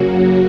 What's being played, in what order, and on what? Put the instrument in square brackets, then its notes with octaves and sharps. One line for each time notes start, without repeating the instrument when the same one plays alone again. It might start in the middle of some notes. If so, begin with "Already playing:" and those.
Already playing: [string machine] F#2 C#3 F#3 A#3 F#4